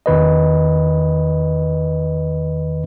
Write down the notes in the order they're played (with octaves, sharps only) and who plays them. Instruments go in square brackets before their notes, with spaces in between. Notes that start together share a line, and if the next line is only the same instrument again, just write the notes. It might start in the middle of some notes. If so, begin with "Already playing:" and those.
[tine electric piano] E2 D#3 B4 D#5